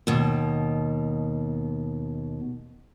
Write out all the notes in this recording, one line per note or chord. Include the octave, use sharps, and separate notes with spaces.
D#2 B2